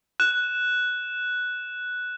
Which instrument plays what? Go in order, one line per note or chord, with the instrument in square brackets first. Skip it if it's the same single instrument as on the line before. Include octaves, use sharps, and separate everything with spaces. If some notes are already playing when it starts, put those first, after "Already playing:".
[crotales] F#6 E7